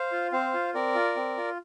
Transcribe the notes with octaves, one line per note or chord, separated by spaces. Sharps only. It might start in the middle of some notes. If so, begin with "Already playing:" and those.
Already playing: C5 F5
F4
C4 C5 F5
F4
C4 A#4 D5
F4
C4
F4